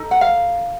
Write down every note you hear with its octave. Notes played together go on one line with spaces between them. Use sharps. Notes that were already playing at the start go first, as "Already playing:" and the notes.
Already playing: D#4 A4
F#5
F5